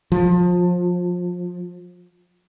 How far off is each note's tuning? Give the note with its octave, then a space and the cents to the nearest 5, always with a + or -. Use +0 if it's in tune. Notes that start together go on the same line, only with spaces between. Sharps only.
F3 +25